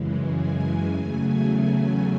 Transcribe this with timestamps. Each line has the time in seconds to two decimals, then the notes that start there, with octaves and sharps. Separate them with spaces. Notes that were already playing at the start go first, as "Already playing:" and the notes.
Already playing: F#2 C#3 E3 G#3
0.23 G#5
0.86 E2 C#3 F#3 A3 G#5